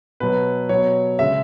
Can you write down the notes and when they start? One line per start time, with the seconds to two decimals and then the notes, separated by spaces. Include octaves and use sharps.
0.20 B2 F#3 B4
0.69 B2 F#3 C#5
1.19 C#3 G#3 E5